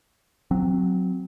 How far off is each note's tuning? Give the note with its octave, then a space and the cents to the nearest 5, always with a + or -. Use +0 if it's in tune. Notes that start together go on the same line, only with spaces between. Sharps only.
F#3 -10 C4 +0